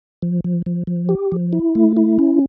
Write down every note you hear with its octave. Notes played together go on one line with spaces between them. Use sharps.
F3
F3
F3
F3
G4
F3
E4
A3
E4
C#4